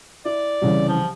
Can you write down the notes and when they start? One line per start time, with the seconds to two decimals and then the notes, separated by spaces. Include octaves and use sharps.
0.25 E4 D5
0.62 C2 C#3 E3
0.88 F3